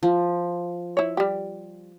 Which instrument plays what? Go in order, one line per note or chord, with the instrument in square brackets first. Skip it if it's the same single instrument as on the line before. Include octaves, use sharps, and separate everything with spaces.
[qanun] F3
[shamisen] E4 C#5
G3 G4